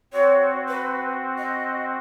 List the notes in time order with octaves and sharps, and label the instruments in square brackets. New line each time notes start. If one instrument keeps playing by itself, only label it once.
[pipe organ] C4 F#4 [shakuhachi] C#5
[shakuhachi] B4
D#5